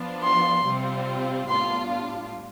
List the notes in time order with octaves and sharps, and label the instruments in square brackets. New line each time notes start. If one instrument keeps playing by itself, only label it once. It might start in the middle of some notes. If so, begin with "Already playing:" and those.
Already playing: [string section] F3 B3 D4 F4
[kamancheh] C6
[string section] C3 G3 C4 F4
[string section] A2 G3 B3 D4 F4 [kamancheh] C6